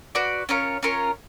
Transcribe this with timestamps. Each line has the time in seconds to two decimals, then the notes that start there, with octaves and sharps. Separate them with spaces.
0.15 F#4 B4 D5
0.49 C#4 F4 A#4 C#5
0.83 C#4 F4 A#4 C#5